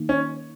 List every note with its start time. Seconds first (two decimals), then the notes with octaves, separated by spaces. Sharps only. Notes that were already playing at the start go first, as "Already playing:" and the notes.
Already playing: D#3 A#3 D#4
0.09 C#4